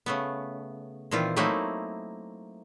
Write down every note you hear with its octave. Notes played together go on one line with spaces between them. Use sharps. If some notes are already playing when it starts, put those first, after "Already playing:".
C#3 A3 B3
A#2 D#3 E3 C4 F4
F#3 A3 A#3 C4 D#4 E4